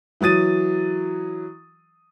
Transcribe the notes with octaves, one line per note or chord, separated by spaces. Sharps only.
E3 F#3 D#6 A6 D#7